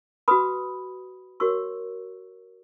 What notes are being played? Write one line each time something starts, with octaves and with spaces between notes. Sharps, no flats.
F#4 B4 B5 D#6
F#4 A#4 C#5 C#6 E6